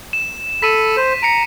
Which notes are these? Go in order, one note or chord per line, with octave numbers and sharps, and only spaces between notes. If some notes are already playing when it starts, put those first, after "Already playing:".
E7
A4 B5 B6 D#7
C5
A#5 C#7 D7